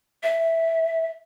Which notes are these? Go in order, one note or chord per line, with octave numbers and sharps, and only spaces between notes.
E5